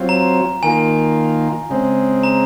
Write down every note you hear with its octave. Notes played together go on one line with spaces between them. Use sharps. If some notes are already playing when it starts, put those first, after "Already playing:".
Already playing: F#3 C4 F4
A#5
D#3 A#3 F4 G#5
C#3 G#3 C4
A#5